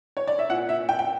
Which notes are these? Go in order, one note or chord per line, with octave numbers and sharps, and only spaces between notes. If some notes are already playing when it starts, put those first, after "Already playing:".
C#5
D5
E5
A#2 F#5
E5
G5
G5